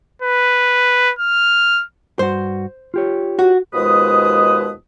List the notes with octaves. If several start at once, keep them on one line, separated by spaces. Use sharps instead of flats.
B4
F6
G2 F#4 C5
F4 G4 C#5
F#4
D#2 B2 F3 G#3 B4 D#6